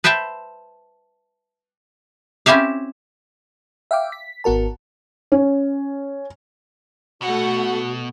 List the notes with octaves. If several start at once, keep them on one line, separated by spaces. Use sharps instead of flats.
B4 C5 E5 G5 A5
C4 C#4 E4 G4 E5 F5
E5 F5 G5 D6
B6
G#1 B3 F#4 A#4 A5
C#4
B2 A3 F#4 F#5